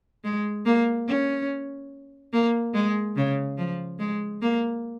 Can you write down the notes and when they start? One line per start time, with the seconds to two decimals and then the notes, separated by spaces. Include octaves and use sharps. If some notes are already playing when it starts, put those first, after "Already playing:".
0.24 G#3
0.66 A#3
1.08 C#4
2.33 A#3
2.74 G#3
3.16 C#3
3.58 F3
3.99 G#3
4.42 A#3